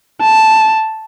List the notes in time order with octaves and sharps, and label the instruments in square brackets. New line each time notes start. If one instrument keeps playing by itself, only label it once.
[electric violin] A5